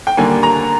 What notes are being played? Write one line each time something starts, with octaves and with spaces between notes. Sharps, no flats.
G5
D#2 D3 G3 A#3 G#5
A#5